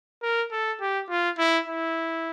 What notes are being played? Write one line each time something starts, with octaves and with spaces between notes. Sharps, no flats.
A#4
A4
G4
F4
E4
E4